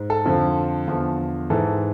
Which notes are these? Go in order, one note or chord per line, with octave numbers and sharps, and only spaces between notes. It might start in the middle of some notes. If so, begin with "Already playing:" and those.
Already playing: G#2
A4
F2 D3 F3
E2 D3 F3
G#2 E3 A4